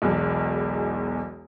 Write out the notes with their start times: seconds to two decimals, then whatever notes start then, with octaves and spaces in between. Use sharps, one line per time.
0.02 E1 B1 E2